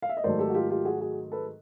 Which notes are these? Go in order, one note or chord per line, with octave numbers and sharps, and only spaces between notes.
F5
E5
D#5
G#2 D#3 F#3 A3 C5 D5
G4 A4
F#4
F4 G4
F4 G4
F#4 G#4
F#4 G#4
A4 B4